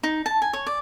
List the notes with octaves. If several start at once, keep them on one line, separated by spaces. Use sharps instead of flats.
D#4
A5
G#5
C#5
D5